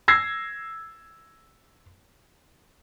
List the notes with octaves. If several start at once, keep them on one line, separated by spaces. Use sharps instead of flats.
E6 G#6 A#6 C7